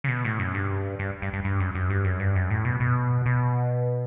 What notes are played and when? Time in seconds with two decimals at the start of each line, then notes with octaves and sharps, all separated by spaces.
0.04 C#3
0.08 B2
0.25 A2
0.39 F#2
0.54 G2
0.99 G2
1.22 G2
1.33 G2
1.44 G2
1.60 F#2
1.75 F#2
1.90 G2
2.05 F#2
2.20 G2
2.36 F#2
2.51 A2
2.65 B2
2.80 B2
3.26 B2